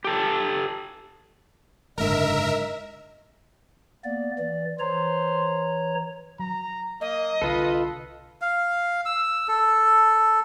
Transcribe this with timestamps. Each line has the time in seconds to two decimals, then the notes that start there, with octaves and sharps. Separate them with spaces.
0.04 G4 A4
1.98 F#1 G#2 D3 A#4 D#5 E5
4.04 A#3 B3 D5
4.38 E3 D5
4.80 E3 C5 C#5 A#5
6.39 F#3 A#5
7.01 A#3 D#5
7.42 C2 D3 F4 A4 B4
8.41 F5
9.06 E6
9.48 A4